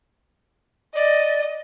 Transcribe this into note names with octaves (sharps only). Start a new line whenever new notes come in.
D5 D#5